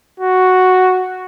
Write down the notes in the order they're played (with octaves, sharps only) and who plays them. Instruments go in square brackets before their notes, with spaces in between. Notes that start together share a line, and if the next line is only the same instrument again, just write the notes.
[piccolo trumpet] F#4